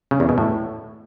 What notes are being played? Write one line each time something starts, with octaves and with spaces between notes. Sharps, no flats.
C#3
E2
B2
A2